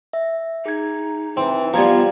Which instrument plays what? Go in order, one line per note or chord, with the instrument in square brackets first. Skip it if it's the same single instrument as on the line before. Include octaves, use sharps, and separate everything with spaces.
[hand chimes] E5
[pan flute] D#4 [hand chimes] G#4 G#6
[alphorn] E3 [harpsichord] C4
[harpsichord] F3 G3 [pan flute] B3 [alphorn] F4 [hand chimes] A#5 G#6